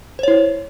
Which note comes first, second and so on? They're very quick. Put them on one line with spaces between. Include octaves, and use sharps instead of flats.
C5 C#5 E4